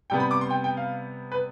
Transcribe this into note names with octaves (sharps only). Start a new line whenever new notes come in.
C3 G3 B3 G5
B5
D6
C6
G5
G5
F5
B4